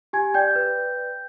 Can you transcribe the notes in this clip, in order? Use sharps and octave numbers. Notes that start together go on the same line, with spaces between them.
G4 G#5 G#6
D5 G5 G6
B4